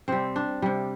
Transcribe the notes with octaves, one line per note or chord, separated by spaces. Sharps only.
C3 G3 C4
D4
C3 G3